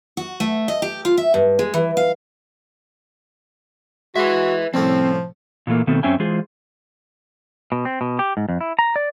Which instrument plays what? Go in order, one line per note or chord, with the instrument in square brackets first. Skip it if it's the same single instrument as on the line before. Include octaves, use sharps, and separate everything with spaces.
[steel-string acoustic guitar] F#4
A3
D#5
G4
F4
E5
G2
G#3
E3
F5
[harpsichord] G#3 [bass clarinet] F#4 [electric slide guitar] B4 E5
[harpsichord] C2 A2 C#4 [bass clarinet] F3 [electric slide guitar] C4
[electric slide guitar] A#2 E3 A3 A#3
B2 D#3 A3 B3 C4
F#2 C4 C#4 E5 G5 G#5
E3 G#3 F4 G#4 C5
B2
C4
B2
G4
G#2
F2
E4
A#5
D5